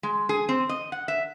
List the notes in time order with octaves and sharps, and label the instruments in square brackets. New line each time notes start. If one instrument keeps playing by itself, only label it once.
[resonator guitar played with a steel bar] G#3
G#4
C4
D#5
F#5
E5